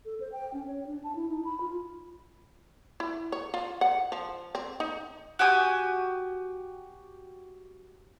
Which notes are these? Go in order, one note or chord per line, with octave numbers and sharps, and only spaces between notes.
A4
C5
G5
C#4
C#5
D4
A5
E4
D#4
B5
F4
E4
C#5
F4
F#5
F3
C4
D#4
F#4 G4 G#5 D#6